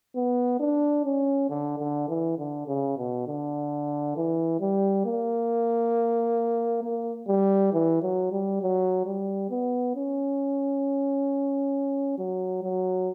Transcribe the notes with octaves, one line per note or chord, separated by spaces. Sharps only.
B3
D4
C#4
D3
D3
E3
D3
C#3
B2
D3
E3
G3
A#3
A#3
G3
E3
F#3
G3
F#3
G3
B3
C#4
F#3
F#3